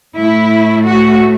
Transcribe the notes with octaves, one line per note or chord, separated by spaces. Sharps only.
A2 A3 E4
F#4